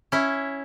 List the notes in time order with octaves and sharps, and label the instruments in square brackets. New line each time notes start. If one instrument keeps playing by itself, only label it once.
[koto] C#4 E4